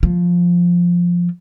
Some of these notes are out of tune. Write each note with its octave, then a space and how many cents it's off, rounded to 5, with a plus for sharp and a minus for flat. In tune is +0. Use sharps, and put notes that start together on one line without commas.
F3 +5